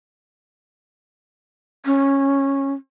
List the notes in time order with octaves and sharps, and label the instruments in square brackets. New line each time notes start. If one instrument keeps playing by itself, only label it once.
[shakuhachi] C#4